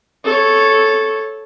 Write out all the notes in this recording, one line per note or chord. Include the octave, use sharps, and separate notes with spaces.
A4 C#5